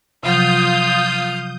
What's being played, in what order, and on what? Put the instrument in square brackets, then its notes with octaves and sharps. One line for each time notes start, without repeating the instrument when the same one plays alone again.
[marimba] C3 F3 F#3 [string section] F4 [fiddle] F5 F6 [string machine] D#6 G6